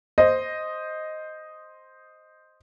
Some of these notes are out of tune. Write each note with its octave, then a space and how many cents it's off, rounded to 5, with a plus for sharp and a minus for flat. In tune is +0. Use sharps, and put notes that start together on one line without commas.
C5 +0 D#5 +0